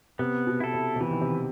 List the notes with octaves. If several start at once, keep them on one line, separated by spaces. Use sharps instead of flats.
C3 B3
B2
E4 A4
C3
C3
B2 E3
D#3
C3